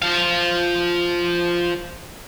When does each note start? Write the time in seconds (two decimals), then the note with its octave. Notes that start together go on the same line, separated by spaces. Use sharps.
0.02 F3 F5